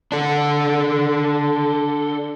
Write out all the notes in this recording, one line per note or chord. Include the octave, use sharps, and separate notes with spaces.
D4 A4